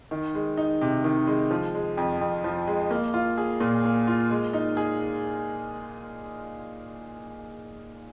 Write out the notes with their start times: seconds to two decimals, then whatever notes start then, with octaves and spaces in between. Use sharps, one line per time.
0.11 D#3
0.35 G#3
0.57 D#4
0.81 C3
1.04 D#3
1.27 G#3
1.51 F3
1.75 G#3
1.97 F2
2.21 F2
2.44 F3
2.67 G#3
2.91 A#3
3.14 F4
3.38 G#4
3.60 A#2
3.84 A#3
4.07 F4
4.30 G#3
4.53 D#4
4.77 G#4